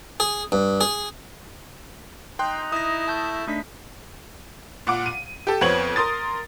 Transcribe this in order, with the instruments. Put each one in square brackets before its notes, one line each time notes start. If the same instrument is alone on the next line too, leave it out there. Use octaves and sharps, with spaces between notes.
[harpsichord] G#4
G2
G#4
[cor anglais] D#4 [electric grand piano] G5 C6 F#6
[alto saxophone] E4 [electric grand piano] D#6 A#6
[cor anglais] A3 [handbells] A5 G6
[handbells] A3 D4 B6 [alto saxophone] D#4
[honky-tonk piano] A#2 F#5 D6
D#7
G4 A4
F2 B3 C4 C#5 G#6 F#7
A#4 C6 D#6 A6